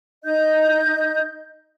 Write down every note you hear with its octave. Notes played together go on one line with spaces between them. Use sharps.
D#4 D#5 G6